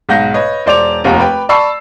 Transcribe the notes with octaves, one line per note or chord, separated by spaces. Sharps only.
B1 G#2 F#5 G6 A#6
B4 C#5 D#5
E1 C5 D5 D6 F7
F1 D#2 F#5 A#5
B4 G5 B5
D5 A5 B5 C#6 E6 C7